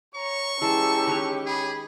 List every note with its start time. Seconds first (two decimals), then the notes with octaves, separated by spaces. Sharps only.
0.15 C#5 A#5 C#6
0.62 E3 G#3 C#4 G4 A5 A#5 E6
1.07 D#3 B4 C#5
1.46 G#4 B5